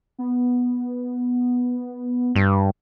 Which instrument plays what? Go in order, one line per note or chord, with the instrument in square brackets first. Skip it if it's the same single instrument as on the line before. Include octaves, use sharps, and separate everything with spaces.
[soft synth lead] B3
[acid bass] G2